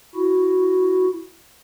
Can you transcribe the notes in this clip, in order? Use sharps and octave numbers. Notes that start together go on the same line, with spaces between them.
E4 F#4